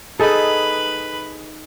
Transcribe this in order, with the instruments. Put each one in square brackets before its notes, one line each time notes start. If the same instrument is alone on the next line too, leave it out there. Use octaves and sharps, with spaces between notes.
[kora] D#4 A4 [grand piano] G#4 [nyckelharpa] B4 B5